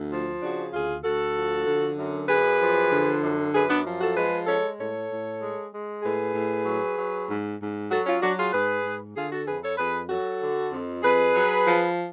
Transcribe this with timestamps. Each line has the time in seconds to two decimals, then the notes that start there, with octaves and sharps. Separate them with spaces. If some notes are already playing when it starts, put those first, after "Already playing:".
Already playing: D2
0.11 F3
0.41 C#3 D4 F#4
0.73 D2 F4 G#4
1.03 D2 F#4 A4
1.35 F3
1.67 D3
1.98 F#2
2.29 F#2 G#4 B4
2.61 F3
2.91 D3
3.22 F#2
3.53 F#2 G#4 B4
3.69 B3 D4
3.85 F3
4.00 F#4 A4
4.16 G#3 G#4 B4
4.47 G#3 A4 C#5
4.78 A2 A4 C#5
5.10 A2
5.41 G#3
5.73 G#3
6.03 A2 G#4 B4
6.34 A2
6.66 F#3
6.97 F#3
7.28 G#2
7.60 G#2
7.90 F#3 F#4 A4
8.06 C#4 F4
8.21 F#3 D4 F#4
8.37 F4 G#4
8.52 G#2 G#4 B4
8.84 G#2
9.15 D3 F4 G#4
9.31 F#4 A4
9.46 F2 G#4 B4
9.62 A4 C#5
9.77 F2 G#4 B4
10.09 F#3 F#4 A4
10.41 D3
10.71 F2
11.03 F2 G#4 B4
11.34 F#3
11.65 F3